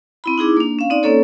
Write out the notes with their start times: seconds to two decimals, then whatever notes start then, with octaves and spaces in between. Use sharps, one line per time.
0.24 C4 E4 B5
0.38 D#4 E4 G#4 D6
0.57 A#3 D4
0.79 C#4 F5
0.90 C4 D#4 D5
1.03 A#3 C#4 A4 C#5